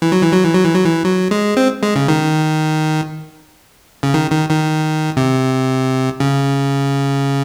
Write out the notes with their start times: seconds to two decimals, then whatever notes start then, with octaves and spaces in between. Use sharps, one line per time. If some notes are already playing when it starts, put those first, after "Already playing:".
0.02 E3
0.12 F#3
0.23 E3
0.33 F#3
0.43 E3
0.54 F#3
0.64 E3
0.74 F#3
0.85 E3
1.05 F#3
1.31 G#3
1.57 C4
1.83 G#3
1.96 C#3
2.08 D#3
4.03 C#3
4.14 D#3
4.31 D#3
4.49 D#3
5.17 C3
6.20 C#3